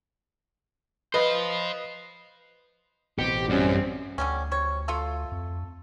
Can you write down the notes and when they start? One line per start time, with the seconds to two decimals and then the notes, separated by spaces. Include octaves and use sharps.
1.14 B4 C5 D#5 F5
3.19 A1 B2 C4 G4 C#7
3.49 F#2 G3 C4 C#4
4.18 D2 D3 G3 C#4
4.51 C3 C#5
4.88 A3 F4 A4
5.32 F2